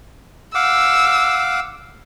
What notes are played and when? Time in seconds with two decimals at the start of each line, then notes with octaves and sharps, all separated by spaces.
0.55 F5 F#5 D6 E6